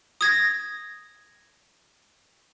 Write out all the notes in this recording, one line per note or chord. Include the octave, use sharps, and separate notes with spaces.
D#6 G#6 A#6